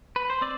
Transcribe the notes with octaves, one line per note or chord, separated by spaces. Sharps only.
B4
C5
C4 D5